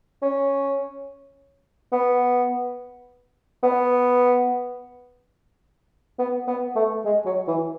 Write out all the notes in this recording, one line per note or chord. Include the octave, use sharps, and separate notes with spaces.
C#4
B3
B3
B3
B3
A3
G#3
F#3
E3